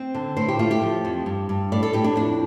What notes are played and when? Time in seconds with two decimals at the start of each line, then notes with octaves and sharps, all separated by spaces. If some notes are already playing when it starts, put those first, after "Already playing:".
Already playing: C4
0.14 D3
0.36 A2 C5
0.49 G4
0.59 A3 F4
0.71 G4
0.82 F3
1.05 F2
1.26 G2
1.49 G2
1.72 A2 D5
1.83 A4
1.93 A2 G4
2.04 D4
2.16 F2 D4